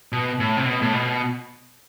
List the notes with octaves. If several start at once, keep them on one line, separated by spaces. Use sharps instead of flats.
B2
A2
C3
B2
A2
B2